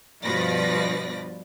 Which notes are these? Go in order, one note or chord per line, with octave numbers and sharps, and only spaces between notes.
G2 B2 F3 B4 D5 A#6